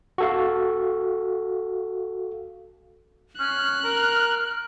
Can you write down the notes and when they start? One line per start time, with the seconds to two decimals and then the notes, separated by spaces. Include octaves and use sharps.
0.18 F#4 A4 F5
3.40 C#4 F6 F#6
3.84 A#4